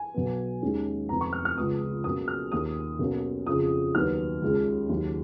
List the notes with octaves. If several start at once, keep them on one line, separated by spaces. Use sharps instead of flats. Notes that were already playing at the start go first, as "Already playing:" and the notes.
Already playing: G#5
B1 B2 F#3 B3
D#2 D#3 G#3 C#4
F1 F2 F3 B3 A#5
C#6
F6
F6
C#2 C#3 F3 G#3 B3 D#6
B1 B2 A#3 C#4 D#6
F6
D#2 D#3 A#3 D#6
B1 B2 A#3 C#4
F2 C#3 F3 D#6
D#2 D#3 F#3 B3 F6
C#2 C#3 G#3 C#4
D#2 D#3 F#3